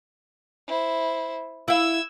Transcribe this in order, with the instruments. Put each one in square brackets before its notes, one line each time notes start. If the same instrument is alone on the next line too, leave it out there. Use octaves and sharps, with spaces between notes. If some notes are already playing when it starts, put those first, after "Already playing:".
[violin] E4 C5
[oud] E4 F5 [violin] E6 G#6